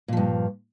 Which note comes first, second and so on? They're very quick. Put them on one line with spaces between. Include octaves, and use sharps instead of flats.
A#2 F3 G2